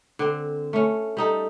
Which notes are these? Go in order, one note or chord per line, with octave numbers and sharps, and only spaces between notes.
D3 C4
A3 C#4
G3 D#4 A4